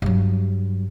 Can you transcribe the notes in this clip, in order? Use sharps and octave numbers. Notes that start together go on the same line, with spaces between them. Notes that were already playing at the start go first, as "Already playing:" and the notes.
G2 F#3